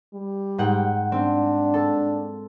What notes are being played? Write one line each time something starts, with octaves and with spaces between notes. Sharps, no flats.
G3
G#2 F#5 G5
C4 D4
A4